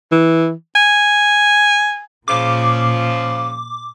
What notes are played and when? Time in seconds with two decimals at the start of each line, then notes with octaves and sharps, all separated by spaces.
0.12 E3
0.75 G#5
2.28 A#2 C#3 F3 D6